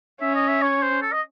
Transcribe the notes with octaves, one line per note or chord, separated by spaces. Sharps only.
C#4 E5
D#5
E5
C#5
C5
A4
D#5